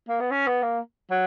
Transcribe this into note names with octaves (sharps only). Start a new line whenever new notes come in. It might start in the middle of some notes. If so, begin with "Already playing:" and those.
A#3
B3
C#4
B3
A#3
F#3